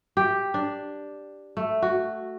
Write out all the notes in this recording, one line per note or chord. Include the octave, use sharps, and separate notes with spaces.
G4
D4
A3
F#4